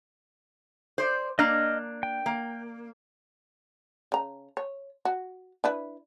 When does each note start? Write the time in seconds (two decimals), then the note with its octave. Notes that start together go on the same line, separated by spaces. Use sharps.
0.98 C5 D5
1.39 A#3 D4 D#5 F6
2.03 G5
2.26 A#3
4.12 C#3 A#5
4.57 C#5
5.05 F#4
5.64 D4 E4 B4